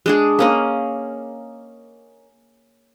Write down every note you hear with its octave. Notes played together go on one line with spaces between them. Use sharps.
G#3 D4 G#4
A#3 C#4 D#5